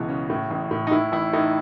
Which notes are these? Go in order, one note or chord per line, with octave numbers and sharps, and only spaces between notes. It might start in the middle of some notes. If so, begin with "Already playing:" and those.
Already playing: C#2 B2 E3 F#4
C#3
A2
A1
A2
D#4
A2 E4
A1 E4
A2 D#4